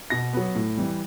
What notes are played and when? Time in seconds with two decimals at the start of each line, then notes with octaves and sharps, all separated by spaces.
0.10 B2 A#6
0.33 F#3 B3
0.55 A2
0.77 E3 G3